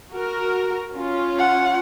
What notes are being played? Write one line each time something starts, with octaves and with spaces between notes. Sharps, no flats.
F#4 A#4
C#4 F4
F#5